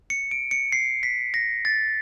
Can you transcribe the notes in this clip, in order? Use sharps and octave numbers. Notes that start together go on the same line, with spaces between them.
C#7
D7
C#7
C7
B6
A#6
A6